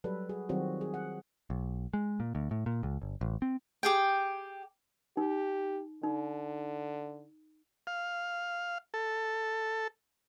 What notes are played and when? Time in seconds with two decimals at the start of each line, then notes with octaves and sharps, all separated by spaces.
0.04 F#3 G3 A4 B4
0.29 F#4 G#4
0.49 D#3 F#3 G3 C4 F4 F#4
0.81 G#4
0.94 F#5
1.50 B1
1.94 G#3
2.20 A#2
2.35 D2
2.51 A2
2.66 A#2
2.83 C#2
3.02 G1
3.21 A1
3.42 C4
3.83 G4 G#4 G5
5.17 D#4 G4
6.03 D3 D#4
7.87 F5
8.94 A4